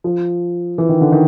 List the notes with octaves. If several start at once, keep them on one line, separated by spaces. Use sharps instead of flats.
F3
E3
D#3
D3
D#3